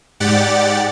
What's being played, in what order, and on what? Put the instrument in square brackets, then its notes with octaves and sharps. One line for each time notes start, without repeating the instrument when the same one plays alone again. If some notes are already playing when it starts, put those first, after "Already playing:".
[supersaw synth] G#2 G4 D5 F#5 A6